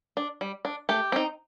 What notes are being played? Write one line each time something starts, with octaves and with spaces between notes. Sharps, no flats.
D4
G3
D4
A3 G4
C4 D#4